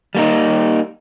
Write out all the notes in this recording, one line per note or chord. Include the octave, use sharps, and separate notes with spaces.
G3 A#3 D#4